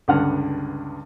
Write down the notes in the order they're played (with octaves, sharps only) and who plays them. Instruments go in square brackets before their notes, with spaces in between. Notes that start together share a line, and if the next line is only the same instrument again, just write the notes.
[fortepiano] C#2 G2 D3 F#5 F6